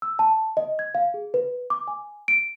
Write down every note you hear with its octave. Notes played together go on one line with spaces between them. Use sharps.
E6
A5
D#5
G#6
F5
G#4
B4
D6
G#5
D7